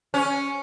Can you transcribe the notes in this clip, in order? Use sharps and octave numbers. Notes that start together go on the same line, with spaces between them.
C#4